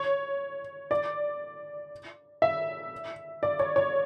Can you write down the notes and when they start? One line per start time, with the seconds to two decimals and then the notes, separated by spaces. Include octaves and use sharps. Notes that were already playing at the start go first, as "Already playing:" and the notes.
Already playing: C#5
0.91 D5
2.42 E5
3.43 D5
3.60 C#5
3.76 C#5